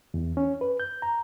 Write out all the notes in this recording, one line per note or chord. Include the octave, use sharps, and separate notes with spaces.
E2
C#4
B4
G6
A#5